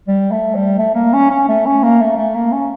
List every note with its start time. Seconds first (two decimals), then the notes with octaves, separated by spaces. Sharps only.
0.08 G3
0.31 A3
0.55 G3
0.78 A3
0.95 A#3
1.13 C#4
1.30 C#4
1.48 A3
1.66 C#4
1.83 A#3
2.01 A3
2.17 A3
2.35 A#3
2.52 C#4